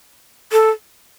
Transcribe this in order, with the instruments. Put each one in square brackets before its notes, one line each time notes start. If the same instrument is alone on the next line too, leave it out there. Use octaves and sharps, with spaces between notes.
[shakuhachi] A4